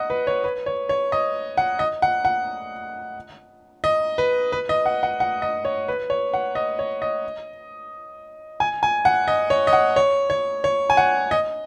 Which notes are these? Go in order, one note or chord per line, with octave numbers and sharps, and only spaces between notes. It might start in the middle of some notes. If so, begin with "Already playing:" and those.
Already playing: D#5 F#5
B4
C#5
B4
C#5
C#5
D#5
F#5
D#5
F#5
F#5
D#5
B4
B4
D#5
F#5
F#5
F#5
D#5
C#5
B4
C#5
F#5
D#5
C#5
D#5
G#5
G#5
F#5
D#5
C#5
D#5
F#5
C#5
C#5
C#5
G#5
F#5
D#5